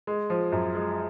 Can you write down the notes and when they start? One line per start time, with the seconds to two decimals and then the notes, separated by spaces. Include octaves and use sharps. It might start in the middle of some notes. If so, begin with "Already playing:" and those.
0.07 G#3
0.30 F3
0.52 F#2
0.75 G#3